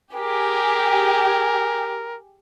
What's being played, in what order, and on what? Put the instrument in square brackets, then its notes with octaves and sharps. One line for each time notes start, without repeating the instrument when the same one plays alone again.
[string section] G4 G#4 [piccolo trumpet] A#4